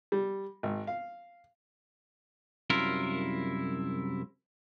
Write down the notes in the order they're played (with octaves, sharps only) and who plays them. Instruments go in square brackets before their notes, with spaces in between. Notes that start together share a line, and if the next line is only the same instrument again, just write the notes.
[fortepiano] G3
G#1
F5
[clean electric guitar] C2 F#2 E4 F4 A#4